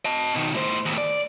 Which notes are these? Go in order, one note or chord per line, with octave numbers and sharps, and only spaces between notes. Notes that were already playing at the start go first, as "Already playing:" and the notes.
D#5 A5
B2 D#3
A2 C5
D#2 A2
D5